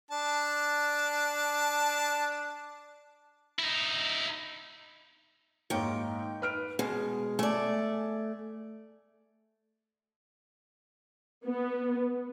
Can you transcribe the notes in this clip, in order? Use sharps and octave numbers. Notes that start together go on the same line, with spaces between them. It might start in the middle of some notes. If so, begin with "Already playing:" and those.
D4 A5
D#4 E4
G#2 D#3 A#3 C#5 G5
B4 F6 D7
B2 G#3 B3
A3 D5 G#5
B3